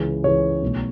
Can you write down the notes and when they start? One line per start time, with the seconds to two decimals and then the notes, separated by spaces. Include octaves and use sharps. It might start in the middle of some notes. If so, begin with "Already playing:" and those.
Already playing: C#2 C#3 E3
0.23 C#2 C#3 E3 C#5
0.62 B1 B2 A3